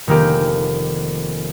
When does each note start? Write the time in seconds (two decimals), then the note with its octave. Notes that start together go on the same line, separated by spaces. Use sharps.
0.07 F1 D#3 A#3 G4